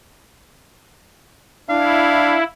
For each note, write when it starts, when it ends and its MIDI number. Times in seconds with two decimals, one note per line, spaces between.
1.70 2.39 62
1.70 2.44 64
1.70 2.46 77